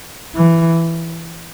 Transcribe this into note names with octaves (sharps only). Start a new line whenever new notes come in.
E3